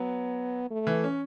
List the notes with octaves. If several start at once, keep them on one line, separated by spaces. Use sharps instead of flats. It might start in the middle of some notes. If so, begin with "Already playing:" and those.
Already playing: F#3 B3
A3
E3
C#4